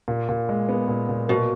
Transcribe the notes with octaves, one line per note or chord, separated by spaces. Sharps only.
A#2
A#2
G#3
B3
A#2
A#2
B2 A#3